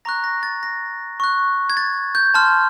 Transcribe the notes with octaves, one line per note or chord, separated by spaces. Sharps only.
A#5 C#6 F#6 A#6
A#6
A6
A#6
C#6 F#6
G#6
A6
G6
A5 C6 F6